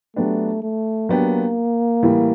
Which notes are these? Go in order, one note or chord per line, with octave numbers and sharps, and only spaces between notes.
F#3 A3 B3 D4 G4
A3
F#3 A#3 B3 D4 G4
A2 E3 G3